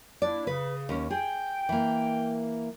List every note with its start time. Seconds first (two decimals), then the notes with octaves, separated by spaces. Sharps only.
0.22 A#3 D4 E4 D5
0.47 C#3 B4
0.89 D#2 C#4
1.10 G#4 G5
1.69 E3 A#3